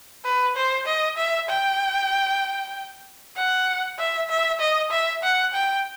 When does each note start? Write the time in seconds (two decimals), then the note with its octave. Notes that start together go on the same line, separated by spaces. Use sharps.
0.25 B4
0.56 C5
0.86 D#5
1.17 E5
1.49 G5
3.36 F#5
3.98 E5
4.30 E5
4.60 D#5
4.91 E5
5.23 F#5
5.54 G5